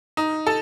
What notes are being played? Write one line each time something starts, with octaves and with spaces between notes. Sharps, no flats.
D#4
A4